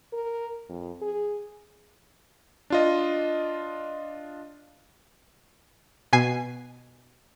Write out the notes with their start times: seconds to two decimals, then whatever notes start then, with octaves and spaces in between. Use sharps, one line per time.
0.13 A#4
0.69 F2
1.02 G#4
2.70 D4 F4 D#5
6.13 B2 G#5 C7